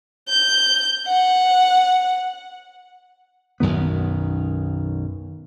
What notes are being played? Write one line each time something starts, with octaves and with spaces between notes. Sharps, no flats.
G6
F#5
B1 F#2 D#3 B3